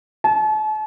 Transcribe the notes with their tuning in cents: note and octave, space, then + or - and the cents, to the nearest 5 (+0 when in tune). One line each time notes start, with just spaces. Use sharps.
A5 -40